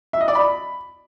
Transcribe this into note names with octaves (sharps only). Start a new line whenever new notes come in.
E5
D#5
D5
B5